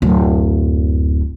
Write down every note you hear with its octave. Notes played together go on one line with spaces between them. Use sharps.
D1 F#2